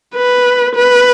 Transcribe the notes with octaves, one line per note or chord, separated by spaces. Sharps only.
B4
B4